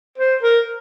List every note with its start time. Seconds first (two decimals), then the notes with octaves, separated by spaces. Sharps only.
0.18 C5
0.43 A#4